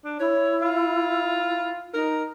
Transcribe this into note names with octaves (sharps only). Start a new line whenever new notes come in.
D4
E4 C#5
F4
D#4 A#4